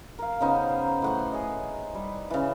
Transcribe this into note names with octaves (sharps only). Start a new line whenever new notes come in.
A#4 F5
C#3 B3 D#4 C5
A2 F#5 C6
G#4 D#5
G3
C#3 E3